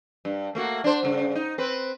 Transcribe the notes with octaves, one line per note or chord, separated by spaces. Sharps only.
G2
A3 A#3 F#4
D4 C5
G2 C#3
D#4
C4 B4